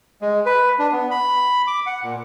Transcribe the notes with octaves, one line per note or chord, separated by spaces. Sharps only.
G#3
B4
D4
B3
B5
D6
F#5
A#2